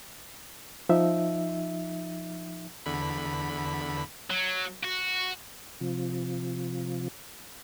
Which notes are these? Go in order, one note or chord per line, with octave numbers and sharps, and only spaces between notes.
F3 D#4 E5
E2 D3 B5
F#3
F#4
C3 F3